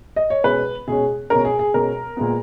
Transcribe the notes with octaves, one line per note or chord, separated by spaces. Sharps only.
D#5
C#5
B2 G#3 C#4 B4
B2 G#3 C#4 G#4
B2 G#3 C#4 A#4
G#4
G#4
B2 G#3 C#4 A#4
A#2 G#3 B3